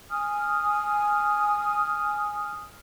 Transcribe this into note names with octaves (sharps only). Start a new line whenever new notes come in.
G#5 D#6 F6